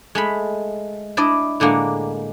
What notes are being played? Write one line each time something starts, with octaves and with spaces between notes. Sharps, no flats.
G#3 A3 B5
D4 E4 D5 D#5
A2 D3 G#3 A#3